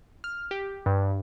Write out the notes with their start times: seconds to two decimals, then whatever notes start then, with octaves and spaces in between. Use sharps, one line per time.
0.24 F6
0.51 G4
0.86 G2